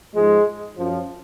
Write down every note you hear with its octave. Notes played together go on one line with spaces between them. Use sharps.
G#2 F3 G#3
F#2 F3